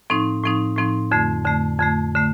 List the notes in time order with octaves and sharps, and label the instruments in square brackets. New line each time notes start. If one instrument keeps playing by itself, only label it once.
[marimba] A2 F3 C4 D#4
A2 F3 C4 D#4
A2 F3 C4 D#4
F2 D3 A3
F2 D3 A3
F2 D3 A3
D3 A3